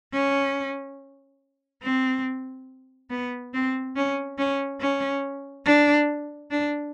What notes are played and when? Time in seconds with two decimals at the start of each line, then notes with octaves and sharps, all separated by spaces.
0.13 C#4
1.83 C4
3.10 B3
3.54 C4
3.96 C#4
4.38 C#4
4.81 C#4
5.66 D4
6.51 D4